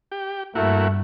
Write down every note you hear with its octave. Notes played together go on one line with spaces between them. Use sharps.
G4
G2 A3 A#3 E4 F#4